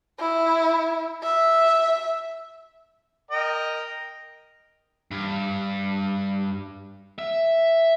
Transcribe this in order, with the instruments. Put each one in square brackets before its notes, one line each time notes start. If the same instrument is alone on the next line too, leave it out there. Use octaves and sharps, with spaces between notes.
[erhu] E4
E5
[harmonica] A#4 D#5 G5
[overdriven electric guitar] G2
E5